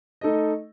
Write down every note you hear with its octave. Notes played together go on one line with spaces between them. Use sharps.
A3 D#4 A4 D#5